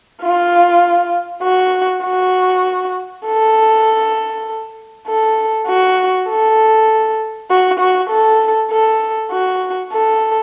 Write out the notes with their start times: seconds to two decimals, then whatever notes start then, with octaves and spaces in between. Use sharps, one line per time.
0.22 F4
1.43 F#4
2.04 F#4
3.26 A4
5.07 A4
5.68 F#4
6.29 A4
7.50 F#4
7.79 F#4
8.10 A4
8.71 A4
9.31 F#4
9.93 A4